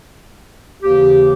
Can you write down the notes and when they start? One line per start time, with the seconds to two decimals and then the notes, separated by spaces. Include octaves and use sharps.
0.82 D#2 C#3 E3 G4